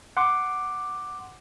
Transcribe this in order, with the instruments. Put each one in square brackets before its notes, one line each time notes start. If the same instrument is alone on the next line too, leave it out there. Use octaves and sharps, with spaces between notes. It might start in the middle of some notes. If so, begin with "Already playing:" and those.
[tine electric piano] F#5 C6 D6